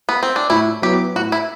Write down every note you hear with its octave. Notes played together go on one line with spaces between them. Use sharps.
B3
C4
D4
A2 E4
F#3 B3 E4 G4
A2 F#4
E4